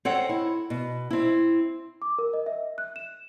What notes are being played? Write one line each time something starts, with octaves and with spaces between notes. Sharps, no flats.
C4 A4 C#5 D#5 F#5
E4
B2
C4 E4
D6
A#4
D#5
E5
F#6
E7